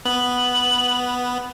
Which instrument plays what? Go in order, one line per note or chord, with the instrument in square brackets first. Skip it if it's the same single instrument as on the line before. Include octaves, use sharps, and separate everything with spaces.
[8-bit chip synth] B3 [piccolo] F#7